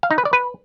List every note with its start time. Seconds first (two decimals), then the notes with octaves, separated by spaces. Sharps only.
0.03 F5
0.11 D#4
0.18 B4
0.25 D5
0.33 B4